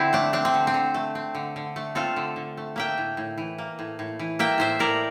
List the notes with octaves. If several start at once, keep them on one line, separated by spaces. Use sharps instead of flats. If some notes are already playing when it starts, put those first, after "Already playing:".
Already playing: D3 C4 E4
A3 D4
C4 D4
C4
D3
C4
D3
A3
C4
D3
D3
A3
C4 F4 A4
D3
D3
A3
A#3 E5 G5
A2
A2
E3
A#3
A2
A2
E3
A#3 E5 G5
A2 C5 E5
A2 A#4 D5